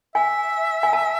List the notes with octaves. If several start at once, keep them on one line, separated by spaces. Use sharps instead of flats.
E5 G#5
G#5
A5